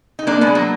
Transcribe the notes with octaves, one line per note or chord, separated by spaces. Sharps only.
D#4
A#3 D4
G#3 B3
F#3 A#3